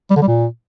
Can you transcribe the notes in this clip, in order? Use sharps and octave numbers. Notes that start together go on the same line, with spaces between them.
G3
D3
G3
A#2